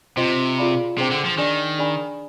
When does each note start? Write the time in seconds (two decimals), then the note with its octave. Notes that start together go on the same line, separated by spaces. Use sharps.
0.17 C3 F4 C5 D#5 G5 C6
0.58 F4 G#4 D5 F5 B5
0.97 C3 D4 G#4 C5 G5 D6
1.11 D3
1.25 F3
1.38 D#3 D4 G#4 D5 G#5
1.78 D4 G#4 D5 G#5 B5